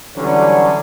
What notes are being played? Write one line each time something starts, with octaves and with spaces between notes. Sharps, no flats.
D3 E3 F#3 G3 C#4 D4